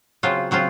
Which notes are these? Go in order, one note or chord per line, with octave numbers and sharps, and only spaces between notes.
C#3 F#3 C4 F4
C#3 F#3 C4 F4